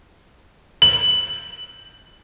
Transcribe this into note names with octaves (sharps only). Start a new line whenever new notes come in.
F#7